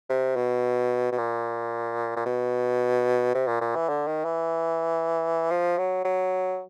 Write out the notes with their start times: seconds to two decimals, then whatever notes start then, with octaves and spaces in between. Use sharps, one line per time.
0.10 C3
0.36 B2
1.12 B2
1.18 A#2
2.16 A#2
2.26 B2
3.35 C3
3.47 A#2
3.61 A#2
3.75 E3
3.88 D3
4.07 D#3
4.25 E3
5.50 F3
5.78 F#3
6.04 F#3